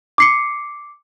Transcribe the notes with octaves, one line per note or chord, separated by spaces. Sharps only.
D6 C7 C#7